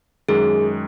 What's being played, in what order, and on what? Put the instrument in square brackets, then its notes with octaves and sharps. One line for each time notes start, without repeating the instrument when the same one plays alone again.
[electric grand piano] F#2 D#3 G#3 [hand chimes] G#4